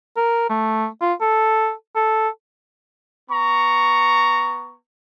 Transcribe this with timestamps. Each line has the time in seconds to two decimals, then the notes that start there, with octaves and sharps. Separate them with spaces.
0.17 A#4
0.49 A3
1.01 F4
1.21 A4
1.95 A4
3.30 B3 A#5 C#6